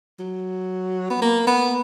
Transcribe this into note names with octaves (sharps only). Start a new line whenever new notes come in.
F#3
B3
A#3
B3